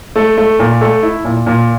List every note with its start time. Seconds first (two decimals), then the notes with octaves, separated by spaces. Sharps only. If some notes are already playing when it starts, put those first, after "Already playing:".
0.16 A3
0.38 A3
0.59 A#2
0.81 A3
1.03 E4
1.25 A#2
1.46 A#2